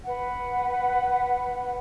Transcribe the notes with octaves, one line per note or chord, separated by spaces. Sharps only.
B4 F#5